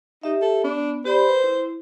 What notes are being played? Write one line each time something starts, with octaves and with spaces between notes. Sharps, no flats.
D#4 G4 E5
A4
B3 D4
G4 C5 D5 B5
B4
E4